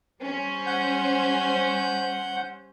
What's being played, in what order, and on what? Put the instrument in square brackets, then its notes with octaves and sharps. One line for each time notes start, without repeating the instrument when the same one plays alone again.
[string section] G3 C#4 C5
[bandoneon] F#5 G6